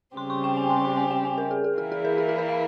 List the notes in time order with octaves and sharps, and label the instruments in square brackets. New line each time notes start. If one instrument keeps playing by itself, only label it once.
[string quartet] C#3 G3 C4 G4 [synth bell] C6
[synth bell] C#6
G5
G#5
C6
C6
G#5
G5
G#5
A#4
G#4
G#4
[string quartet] E3 A#3 E4 [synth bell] G#4
[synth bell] G#4
A#4
G#4
G#4
A#4
F5